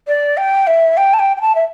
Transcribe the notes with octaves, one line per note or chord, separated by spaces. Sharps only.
D5
G5
E5
G5
A5
G5
G5
A5
E5